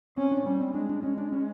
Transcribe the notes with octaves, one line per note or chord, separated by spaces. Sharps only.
C4 C#4
D4
G3 C#4
C4
G#3 D4
D4
G#3 C#4
D4
C#4